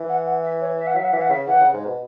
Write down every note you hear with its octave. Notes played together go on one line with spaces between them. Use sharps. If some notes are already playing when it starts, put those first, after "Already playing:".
Already playing: E3
F#5
F#5
E5
C#5
E5
F#5
F#3 E5
F#5
E3 E5
F#5
C#3 E5
E3 F#5
C#3
G#2
B2